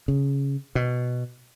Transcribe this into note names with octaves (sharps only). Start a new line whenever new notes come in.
C#3
B2